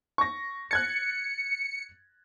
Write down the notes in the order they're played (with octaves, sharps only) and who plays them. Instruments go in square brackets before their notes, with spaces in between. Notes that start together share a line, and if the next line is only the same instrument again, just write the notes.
[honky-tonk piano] C#6 A#6
[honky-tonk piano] F#6 G#6 A6 [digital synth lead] C#7